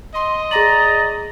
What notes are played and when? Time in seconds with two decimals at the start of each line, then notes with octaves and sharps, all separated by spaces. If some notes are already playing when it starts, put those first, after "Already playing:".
0.14 D#5 C6
0.51 G#4 D5 A#5 A#6 F#7